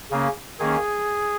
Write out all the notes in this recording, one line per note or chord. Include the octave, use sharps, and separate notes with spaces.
C#3 A#3 C#4
D#3 A#3 C#4 G#4